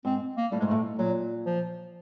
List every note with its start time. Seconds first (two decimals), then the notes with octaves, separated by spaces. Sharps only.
0.05 G#2 C4
0.37 A#3
0.51 A2 G3
0.60 G#2 G#3
0.67 A2 A3
0.98 A#2 F#3
1.46 F3